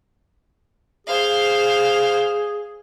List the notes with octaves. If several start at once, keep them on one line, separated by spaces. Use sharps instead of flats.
G#4 C5 F5